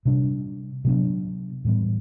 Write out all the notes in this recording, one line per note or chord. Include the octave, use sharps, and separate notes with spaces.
C3 G3 D4
C3 F#3 B3 D4
A2 E3 G3 B3